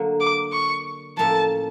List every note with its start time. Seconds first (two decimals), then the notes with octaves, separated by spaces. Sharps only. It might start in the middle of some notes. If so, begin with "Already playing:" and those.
Already playing: D3 F#3 A#3
0.21 D6
0.53 C#6
1.17 A2 F3 A#3 C#4 E4 A5